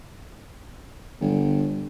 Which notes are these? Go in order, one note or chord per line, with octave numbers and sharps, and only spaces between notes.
G1